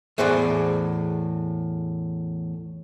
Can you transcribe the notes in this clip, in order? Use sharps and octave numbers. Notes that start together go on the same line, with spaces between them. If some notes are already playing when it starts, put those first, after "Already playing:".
E2 A2 G#4 C5 D5 F#5